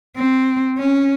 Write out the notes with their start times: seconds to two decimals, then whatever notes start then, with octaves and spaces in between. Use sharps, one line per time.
0.17 C4
0.78 C#4